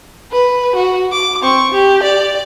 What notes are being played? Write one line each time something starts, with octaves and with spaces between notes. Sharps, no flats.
B4
F#4
D6
C4 C#6
G4
D5